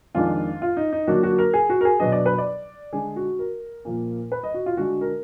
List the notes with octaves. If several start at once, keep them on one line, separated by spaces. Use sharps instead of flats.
F2 D#3 G#3 D4 F4
F4
D#4
D#4
D3 F#3 A#3 D4 F#4
F#4
A#4
G#4
F#4
A#4
G#4
B2 F#3 B3 D4 D#5
D5
B4
D5
D3 G#3 D4 G#4
F#4
A#4
A#2 F3 A#3
B4
D#5
F#4
F4
D3 G#3 D4 F#4
A#4